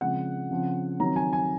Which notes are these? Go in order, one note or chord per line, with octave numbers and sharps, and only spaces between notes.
C#3 F3 G#3 C4 F#5
C#3 F3 C4
D#3 F#3 C4 A#5
G#5
G#5